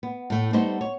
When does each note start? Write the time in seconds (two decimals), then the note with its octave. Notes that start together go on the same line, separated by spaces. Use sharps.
0.03 B3
0.30 A2 A3
0.53 G3 A3 B3 D#4 C5
0.81 C#5